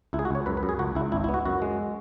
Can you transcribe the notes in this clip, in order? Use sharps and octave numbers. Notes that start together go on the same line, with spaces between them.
C#2 E4
G#4
F#4
C#2 C#5
F#2 B4
B4
F#2
G#4
C#2 F#4
C#2 E4
G#1 E4
E4
B3
F#4
F#2 F#4
G#3